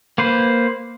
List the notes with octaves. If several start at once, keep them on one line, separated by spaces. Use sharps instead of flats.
A#3 B4 C5